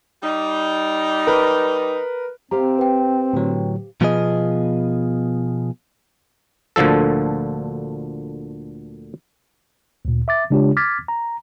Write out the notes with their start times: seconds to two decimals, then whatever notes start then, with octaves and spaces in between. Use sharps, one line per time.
0.23 G3 D#4
1.27 A#4 B4
2.51 C4 G4 C5 F5 A#5
2.78 B4 G5
3.33 A2 D3 F#3
4.01 B2 F3 B3 F4 G#4 D#5
6.76 D2 A#2 D3 F3 A4
10.05 D2 A#2
10.28 E5 D6 A6
10.50 C#3 G#3 D4 F4 G4 C#5
10.77 D6 F6 G#6 A6 B6
11.08 A#5